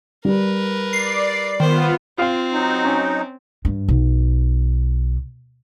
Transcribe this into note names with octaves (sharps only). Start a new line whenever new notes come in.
G3 A#4 B4
D5 C7
D#3 B3 F4 C5
C4 F4 F5
F#3 D#4
C#4
G2
B1